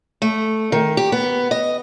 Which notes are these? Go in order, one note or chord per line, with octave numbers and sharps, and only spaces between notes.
A3
D#3
G4
B3
D#5